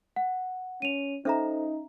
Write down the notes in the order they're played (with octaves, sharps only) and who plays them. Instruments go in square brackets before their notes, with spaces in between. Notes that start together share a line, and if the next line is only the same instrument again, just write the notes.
[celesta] F#5
[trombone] C#4 [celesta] D#7 F7
[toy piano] C#4 E5 A#5 [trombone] D#4 [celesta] A4 C5